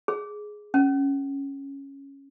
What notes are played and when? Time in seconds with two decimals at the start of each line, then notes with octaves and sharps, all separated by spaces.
0.08 G#4
0.74 C#4